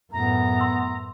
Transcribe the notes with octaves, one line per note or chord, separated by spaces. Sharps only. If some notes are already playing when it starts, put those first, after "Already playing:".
F#2 A2 B3 A#5
C6 E6